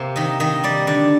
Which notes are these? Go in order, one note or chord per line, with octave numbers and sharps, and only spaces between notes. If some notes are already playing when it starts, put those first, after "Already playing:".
Already playing: C3 A#3 C5
D#3 D#5
D#3 D#5
G3 D5
D3 D5